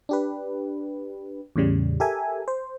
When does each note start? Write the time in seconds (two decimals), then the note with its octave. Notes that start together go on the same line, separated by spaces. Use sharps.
0.09 D4 G4 B4
1.56 E2 A2 C#3 G3
2.00 G4 A4 A#4 E5 G#5
2.48 C5